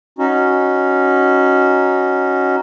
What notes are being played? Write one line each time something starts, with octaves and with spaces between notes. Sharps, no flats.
C#4 D#4 F#4